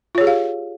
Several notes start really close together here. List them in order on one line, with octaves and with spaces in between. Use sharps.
F4 C#5 G#4 G4 F5